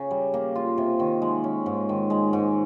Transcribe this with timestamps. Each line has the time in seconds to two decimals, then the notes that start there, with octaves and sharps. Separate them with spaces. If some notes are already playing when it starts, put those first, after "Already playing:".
Already playing: C#3
0.11 G3
0.34 A#3
0.55 F4
0.78 C3
0.99 D#3
1.22 G#3
1.44 C#4
1.66 G#2
1.89 D#3
2.10 G#3
2.33 G#2